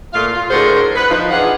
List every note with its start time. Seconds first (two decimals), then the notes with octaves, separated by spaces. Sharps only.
0.13 A#2 A3 F4 F5
0.32 F4
0.50 A2 D3 F#4 G#4 A#4 C5
0.95 B4
1.10 F3 D#4
1.31 E3 D4 G#4 F5 F#5